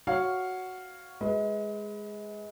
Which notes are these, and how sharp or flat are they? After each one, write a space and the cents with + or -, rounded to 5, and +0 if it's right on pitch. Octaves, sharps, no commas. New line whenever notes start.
F#4 +0 C#5 +0 F5 +0
G#3 +0 B4 +0 D#5 +35